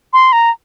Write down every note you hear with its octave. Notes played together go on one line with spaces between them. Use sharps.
C6
A#5